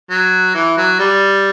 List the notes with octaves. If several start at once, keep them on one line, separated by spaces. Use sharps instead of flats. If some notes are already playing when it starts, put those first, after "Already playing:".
F#3
E3
F#3
G3